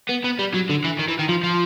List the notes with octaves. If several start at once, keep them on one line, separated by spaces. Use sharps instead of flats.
B3
B3
G3
F#3
D3
E3
D#3
E3
D#3
F3
F3